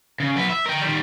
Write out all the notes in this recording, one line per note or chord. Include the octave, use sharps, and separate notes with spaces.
C#3
F#3 B4
E5
A#4 G5
D#3 G3